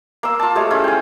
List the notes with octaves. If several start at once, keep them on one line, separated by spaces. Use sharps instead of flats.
A#3 C6 E6
F4 A5
G#3 A3 G4 C#5
C#4 E4 F4
G5 G#5